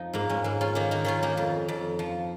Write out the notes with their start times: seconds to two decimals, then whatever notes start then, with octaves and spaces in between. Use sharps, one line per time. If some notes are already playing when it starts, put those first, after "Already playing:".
Already playing: F2 F3 D#4
0.13 G#2 A#3
0.29 G#3 C#4
0.44 G#2 A#3
0.61 C#4 F4
0.75 D#3 A#3 D#4
0.91 A#3 D#4
1.05 D#3 C#4 F4
1.23 A#3 D#4
1.37 F2
1.68 F2
1.99 F3